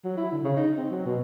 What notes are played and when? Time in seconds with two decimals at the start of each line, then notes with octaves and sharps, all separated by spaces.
0.04 F#3
0.17 E4
0.32 D3
0.44 C#3
0.56 D#4
0.78 C4
0.90 F#3
1.05 B2